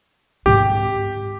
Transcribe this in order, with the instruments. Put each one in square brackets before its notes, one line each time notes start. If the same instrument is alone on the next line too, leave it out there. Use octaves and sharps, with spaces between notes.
[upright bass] G#2 C4 [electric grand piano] G4